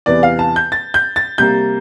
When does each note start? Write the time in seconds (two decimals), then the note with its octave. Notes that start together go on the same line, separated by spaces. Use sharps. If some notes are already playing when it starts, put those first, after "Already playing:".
0.06 E2 C3 E3 D5
0.23 F5
0.39 A5
0.56 G6
0.72 A6
0.94 G6
1.16 A6
1.38 C3 G3 A#3 G6